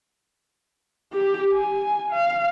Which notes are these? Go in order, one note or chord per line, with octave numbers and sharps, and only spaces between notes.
G4
G#5
F5